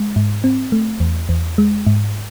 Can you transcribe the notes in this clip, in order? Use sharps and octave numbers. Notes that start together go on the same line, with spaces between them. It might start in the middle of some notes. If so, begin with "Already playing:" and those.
Already playing: G#3
G#2
C4
A3
E2
E2
G#3
G#2